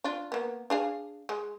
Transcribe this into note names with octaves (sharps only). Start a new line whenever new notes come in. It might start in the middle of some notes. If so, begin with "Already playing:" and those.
D4 F4
A#3 B3
D4 G#4 F5
G#3